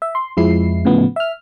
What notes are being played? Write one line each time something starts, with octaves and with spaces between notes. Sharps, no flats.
E5
C6
F2 F3 G#3 E4 C7
A2 C#3 F3 B3
E5 F6